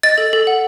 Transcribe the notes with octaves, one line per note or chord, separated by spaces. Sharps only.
D#5 A6
A4
A4
F#5